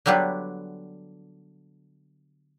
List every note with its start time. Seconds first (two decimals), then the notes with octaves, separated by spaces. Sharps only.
0.06 D3 F#3 G3 B3 D4